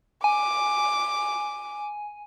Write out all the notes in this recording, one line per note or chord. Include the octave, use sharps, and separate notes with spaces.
G#5 D6